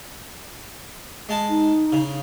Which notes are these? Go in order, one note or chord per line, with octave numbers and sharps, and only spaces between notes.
G#3 A5
D#4
C#3